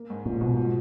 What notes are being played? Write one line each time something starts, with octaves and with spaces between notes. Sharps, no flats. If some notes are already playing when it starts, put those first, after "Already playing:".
Already playing: A#3
G#2
A#2 F3
G#2 B2
F3